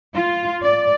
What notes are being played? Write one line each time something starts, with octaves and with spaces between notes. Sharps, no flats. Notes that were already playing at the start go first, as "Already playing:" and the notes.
F4
D5